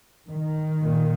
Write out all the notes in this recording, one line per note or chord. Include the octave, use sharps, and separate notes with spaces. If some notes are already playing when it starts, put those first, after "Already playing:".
D#3
A#2